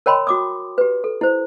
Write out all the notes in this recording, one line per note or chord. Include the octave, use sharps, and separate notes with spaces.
A#4 C#5 G5 B5 C6
F#4 D6 D#6
G4 B4
A4
E4 C5